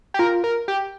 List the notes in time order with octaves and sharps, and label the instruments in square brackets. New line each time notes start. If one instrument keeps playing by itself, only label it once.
[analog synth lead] G4
[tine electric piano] F4 [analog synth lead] A#4
[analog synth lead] A#4
G4